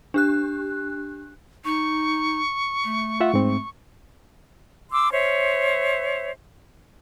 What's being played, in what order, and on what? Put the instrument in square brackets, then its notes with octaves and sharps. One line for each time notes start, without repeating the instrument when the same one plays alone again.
[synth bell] D4 G4 F#6
[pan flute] D#4 [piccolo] C#6
[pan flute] A3
[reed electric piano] F4 E5 F#5
G#2 C4
[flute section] C6 D6 E6
C5 C#5 E5